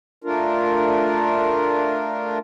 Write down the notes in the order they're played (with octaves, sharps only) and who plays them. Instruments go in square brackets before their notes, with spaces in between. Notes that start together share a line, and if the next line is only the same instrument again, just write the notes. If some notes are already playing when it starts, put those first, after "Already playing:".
[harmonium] A3 D4 F4 A#4